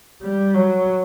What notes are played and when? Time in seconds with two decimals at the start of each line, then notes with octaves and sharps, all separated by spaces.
0.22 G3
0.54 F#3